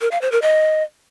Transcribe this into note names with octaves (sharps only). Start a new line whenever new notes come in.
A#4
F5
C5
A#4
D#5